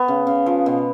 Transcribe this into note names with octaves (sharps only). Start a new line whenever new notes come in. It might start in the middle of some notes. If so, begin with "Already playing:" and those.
Already playing: B3
C#3
C#3
F3
B2